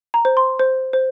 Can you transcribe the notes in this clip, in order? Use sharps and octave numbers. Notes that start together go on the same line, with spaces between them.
A#5
C5
C6
C5
C5